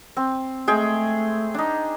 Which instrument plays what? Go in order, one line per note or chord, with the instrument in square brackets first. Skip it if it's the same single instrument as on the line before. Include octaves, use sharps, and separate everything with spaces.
[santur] C4
[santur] G#3 G#4 G5 [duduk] A3
[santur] D4 D#4